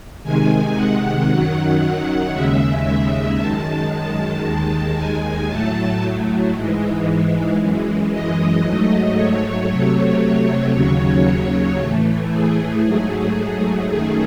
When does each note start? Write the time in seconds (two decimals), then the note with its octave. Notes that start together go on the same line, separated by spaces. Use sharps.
0.23 C3 D#3 G#3 G#5
0.76 F#5
1.29 F#2 D#3 F#3
2.33 D#2 C#3 G#3 E5
3.39 F#2 D#3 G#3 A5
3.91 A5
4.44 D#2 D#3 G#3
4.96 G#5
5.48 A2 F#3 A3 A5
6.53 G#2 E3 G#3
7.59 F#2 E3 G#3
8.11 D#5
8.63 G#2 F#3 A3
9.16 C#5
9.68 C3 F#3 A3
10.73 D#2 C#3 F#3 C#5
11.79 A2 E3 A3
12.31 G#4
12.84 G#2 F#3 A3
13.89 F#2 D#3 A3 G#4